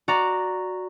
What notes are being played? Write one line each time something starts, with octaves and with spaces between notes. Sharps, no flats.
F#4 D5 A#5